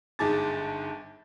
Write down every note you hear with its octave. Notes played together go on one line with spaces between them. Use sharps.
G1 G#2 G#4 A5 D6 A6